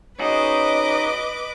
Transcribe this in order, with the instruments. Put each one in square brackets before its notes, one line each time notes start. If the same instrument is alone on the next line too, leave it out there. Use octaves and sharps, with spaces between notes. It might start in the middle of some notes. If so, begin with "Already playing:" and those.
[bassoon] C#4 [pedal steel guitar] D#4 F#4 G#4 [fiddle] B4 D6 [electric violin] D#5